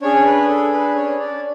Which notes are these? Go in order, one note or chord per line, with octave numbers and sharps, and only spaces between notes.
C#4 D4 G#4 C#5
B4
A4
B4
C#4 C#5
D4 D5